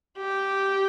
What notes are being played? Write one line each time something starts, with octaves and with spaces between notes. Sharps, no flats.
G4